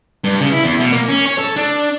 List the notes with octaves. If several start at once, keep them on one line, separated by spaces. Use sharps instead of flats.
G2
C#3
E4
E2
B2
A#3
C#4
C#5
A4
D4